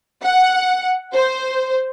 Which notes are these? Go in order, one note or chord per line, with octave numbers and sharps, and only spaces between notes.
F#5
C5